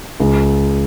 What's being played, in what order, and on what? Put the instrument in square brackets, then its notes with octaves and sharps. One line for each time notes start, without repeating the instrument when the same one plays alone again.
[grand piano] C#2